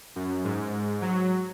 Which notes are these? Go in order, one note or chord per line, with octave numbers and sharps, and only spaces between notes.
F#2
G#2
F#3